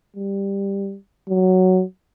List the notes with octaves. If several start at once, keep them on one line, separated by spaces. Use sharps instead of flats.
G3
F#3